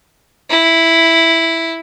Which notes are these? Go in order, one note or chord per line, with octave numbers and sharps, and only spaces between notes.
E4